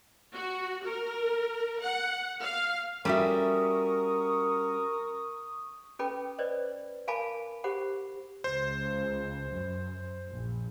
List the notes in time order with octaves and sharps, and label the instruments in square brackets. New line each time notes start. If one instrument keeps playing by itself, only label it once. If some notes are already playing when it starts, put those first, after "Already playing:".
[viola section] F#4
A#4
F#5
F5
[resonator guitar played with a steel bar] G3 A4 E5 [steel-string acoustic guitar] C#4 F#4 [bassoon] A#4 [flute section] C#6 D#6
[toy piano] C#4 A4 B4 G5 B5 D6
B4 C5 D5 D#5
A#4 F5 G#5 A5 B5 D6
G4 C5 F#5 B5 D6
[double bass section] C#2 [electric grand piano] C5
[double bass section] F#2
A#1